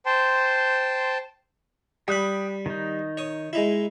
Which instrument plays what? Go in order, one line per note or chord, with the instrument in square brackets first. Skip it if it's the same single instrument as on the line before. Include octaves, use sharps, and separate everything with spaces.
[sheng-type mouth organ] C5 G5 A5 C6
[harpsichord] G3 B5 [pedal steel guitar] G5 D#6 F#6
[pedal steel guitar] D#3 D#4
[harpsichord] C#5 D#6
G#3 D#4 E4